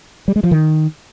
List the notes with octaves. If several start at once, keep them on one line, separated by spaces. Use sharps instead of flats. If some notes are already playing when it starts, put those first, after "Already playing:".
G3
G#3
F3
D#3